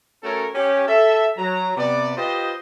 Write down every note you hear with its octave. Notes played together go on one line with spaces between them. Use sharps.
A3 C#4 F#4 A4 A#4 C#5
C#4 G4
A4 E5
F#3 A#5
C3 B3 D5
F4 G4 B4 C5 D#5